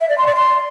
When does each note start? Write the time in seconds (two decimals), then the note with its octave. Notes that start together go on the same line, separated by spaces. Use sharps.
0.01 E5
0.09 D5
0.18 C6
0.27 D5
0.35 C6